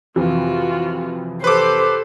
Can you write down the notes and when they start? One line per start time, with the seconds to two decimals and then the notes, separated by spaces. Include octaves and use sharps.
0.16 F2 C3 E3 F4 F#4
1.44 G4 A4 B4 C5 D6